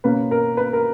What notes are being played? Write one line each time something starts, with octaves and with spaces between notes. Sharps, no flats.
B2 A#3 C#4 B4
A#4
B4
A#4